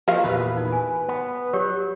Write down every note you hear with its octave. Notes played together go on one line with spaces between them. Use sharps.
F3 A#3 F#4 G4 D#5 F5
E2 A#2 B4
D#4
G#5
B3
F#3 G4 C#5